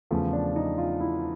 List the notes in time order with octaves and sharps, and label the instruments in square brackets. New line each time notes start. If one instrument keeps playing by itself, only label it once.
[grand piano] E2 C#3 F3 A3
D4
D#4
F4
E4